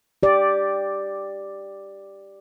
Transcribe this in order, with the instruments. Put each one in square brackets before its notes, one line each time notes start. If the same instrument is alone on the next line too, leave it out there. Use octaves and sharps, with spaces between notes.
[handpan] G4 D5